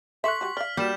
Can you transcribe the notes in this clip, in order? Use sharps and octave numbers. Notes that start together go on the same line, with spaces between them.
A4 E5 C6 C#6 F#6 B6 F#7
G3 F#4
D5 F5 F6
G3 A#3 F#4 G6 E7